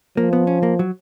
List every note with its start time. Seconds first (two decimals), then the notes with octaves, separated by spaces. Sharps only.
0.17 F3 A#3
0.33 B3
0.47 C#4
0.63 A#3
0.79 F#3